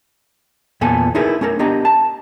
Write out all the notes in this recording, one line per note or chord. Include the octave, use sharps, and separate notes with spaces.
E2 A#2 B3 A4 G#5
D#4 E4 G#4 A#4 B4
A3 C#4 A4 A#4
B3 D4 G4 D#5 A#5
A5